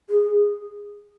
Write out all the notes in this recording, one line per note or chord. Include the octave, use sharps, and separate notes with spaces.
G#4